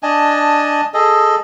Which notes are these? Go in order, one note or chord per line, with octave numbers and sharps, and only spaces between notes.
D4 D#5 G#5 A5
G#4 A4 D#5